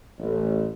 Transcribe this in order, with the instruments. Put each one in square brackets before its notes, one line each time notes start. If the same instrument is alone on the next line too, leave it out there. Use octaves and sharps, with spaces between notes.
[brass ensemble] A1